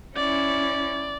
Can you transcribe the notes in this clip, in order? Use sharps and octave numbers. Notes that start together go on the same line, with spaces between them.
C#4 E4 D5